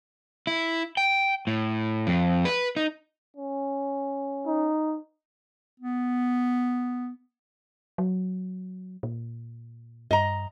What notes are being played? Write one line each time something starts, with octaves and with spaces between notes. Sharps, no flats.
E4
G5
A2
F2
B4
D#4
C#4
D#4
B3
F#3
A#2
G2 D#5 A#5